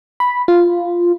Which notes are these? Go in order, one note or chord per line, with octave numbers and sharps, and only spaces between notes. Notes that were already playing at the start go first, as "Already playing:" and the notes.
B5
F4